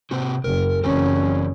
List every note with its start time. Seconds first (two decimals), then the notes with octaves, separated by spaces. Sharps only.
0.11 C3 C4 F#4
0.44 F#1 A#4
0.84 F#1 E3 C4 C#4 A#4